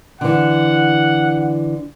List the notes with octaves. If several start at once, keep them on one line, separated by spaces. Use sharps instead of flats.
D3 E3 F#5